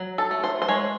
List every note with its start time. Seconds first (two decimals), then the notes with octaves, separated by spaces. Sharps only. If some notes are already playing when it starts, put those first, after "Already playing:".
Already playing: F#3
0.18 A4
0.31 A3
0.44 C5
0.62 C5
0.68 G#3 C#5